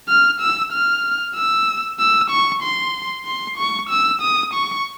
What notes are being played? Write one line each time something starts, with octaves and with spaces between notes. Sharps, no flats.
F6
E6
F6
E6
E6
C#6
C6
C6
C#6
E6
D#6
C#6